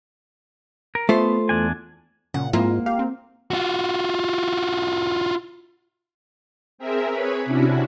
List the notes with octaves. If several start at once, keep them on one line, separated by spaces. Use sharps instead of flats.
A#4
A3 B3 F4 C5
E2 D4 G#5
A#2 C#3 F#5
G#2 G#3 A#3 C4 E4 F4
G4 F5
C4
F4 F#4
C4 G#4 A#4 E5
G#4 B4 C#5 B5
C3 C#4 D4 E4 F#4